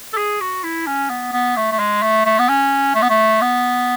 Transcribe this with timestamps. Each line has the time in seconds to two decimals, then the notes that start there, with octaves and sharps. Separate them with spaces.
0.13 A4
0.17 G#4
0.40 F#4
0.63 E4
0.87 C#4
1.09 B3
1.33 B3
1.56 A3
1.72 A3
1.79 G#3
2.02 A3
2.25 A3
2.39 B3
2.49 C#4
2.95 A3
3.02 B3
3.10 A3
3.41 B3